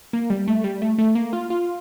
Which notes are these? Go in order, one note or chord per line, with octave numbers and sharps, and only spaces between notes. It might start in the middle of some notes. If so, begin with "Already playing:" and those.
A#3
G3
A3
G3
A3
A3
A#3
F4
F4